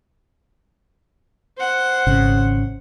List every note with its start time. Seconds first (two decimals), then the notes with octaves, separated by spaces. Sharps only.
1.58 C5 F#5
2.07 G#1 C#3